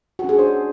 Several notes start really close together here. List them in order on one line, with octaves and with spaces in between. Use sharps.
F#4 C#4 G#4 D4 C5